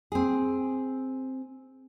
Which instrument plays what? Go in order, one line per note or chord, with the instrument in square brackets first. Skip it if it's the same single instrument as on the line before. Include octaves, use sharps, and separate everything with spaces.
[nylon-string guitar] C4 G#4